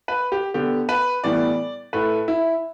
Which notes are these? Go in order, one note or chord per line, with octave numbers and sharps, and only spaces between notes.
B4
G4
D3 B3 G4
B4
A2 E3 G3 B3 D5
A2 A3 B4
E4